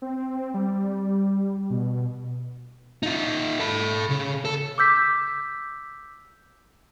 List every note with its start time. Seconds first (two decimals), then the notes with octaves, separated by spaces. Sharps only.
0.02 C4
0.54 G3
1.70 B2
3.03 D#4 F4
3.59 A4 B5
4.10 C#3
4.45 A4
4.78 D6 E6 G6 B6